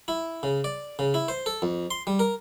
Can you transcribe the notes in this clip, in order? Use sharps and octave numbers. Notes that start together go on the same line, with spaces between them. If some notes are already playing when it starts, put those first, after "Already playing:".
E4
C#3
D5
C#3
E4
C5
A4
F2
C6
G3
A#4